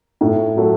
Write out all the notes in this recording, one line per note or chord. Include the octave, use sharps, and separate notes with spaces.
A2
F#3 A3